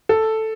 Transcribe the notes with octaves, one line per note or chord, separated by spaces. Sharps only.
A4